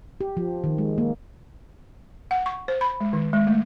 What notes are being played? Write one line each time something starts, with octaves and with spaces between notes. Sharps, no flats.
G4
F3
D#3
G#3
A#3
F#5
C#6
C5
B5
G#3
D#3
G#3
A3